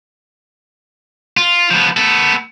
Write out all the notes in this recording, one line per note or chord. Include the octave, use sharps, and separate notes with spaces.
F4
F3 B3
B3 A4